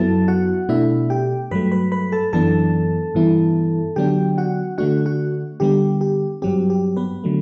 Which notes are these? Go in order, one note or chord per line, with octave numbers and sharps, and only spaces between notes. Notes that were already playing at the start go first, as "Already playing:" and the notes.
Already playing: F#2 F#3 B3 E4 A4 A5
F#4 F#5
B2 A3 D4 E4 E5
G4 G5
G2 F#3 A3 B4 B5
B4 B5
B4 B5
A4 A5
F#2 E3 B3 D4 A4 A5
G2 E3 B3 E4
D3 F#3 B3 D4 G4 G5
F#4 F#5
D3 A3 D4 F#4 F#5
F#4 F#5
D3 G3 B3 G4
G4
G2 F#3 C4 G4
G4
B3 B4
D3 F#3 A3